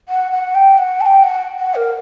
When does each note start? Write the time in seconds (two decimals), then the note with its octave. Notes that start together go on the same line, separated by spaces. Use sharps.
0.09 F#5
0.32 F#5
0.55 G5
0.78 F#5
1.01 A5
1.06 G5
1.23 F#5
1.59 F#5
1.75 A#4